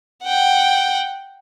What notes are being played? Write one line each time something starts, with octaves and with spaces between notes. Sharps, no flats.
F#5 G5